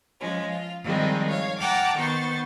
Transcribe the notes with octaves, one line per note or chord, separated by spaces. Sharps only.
F3 G#3 C#4
F4
D#3 F3 G3 G#3 C4 D#4
C#5 F5
F#5 G5 A5 A#5 D6 F6
D#3 B3 C5 C#6 A6